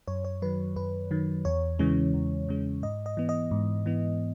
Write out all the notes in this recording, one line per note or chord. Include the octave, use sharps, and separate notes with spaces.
F#2 C#5
C#5
D#3 F#3 B4
F#2 B4
D#3 F#3
E2 C#5
C#3 E3 G#3 C#4
E2
C#3 E3 G#3 C#4
G#2 D#5
D#5
E3 B3
D#5
G#2
E3 B3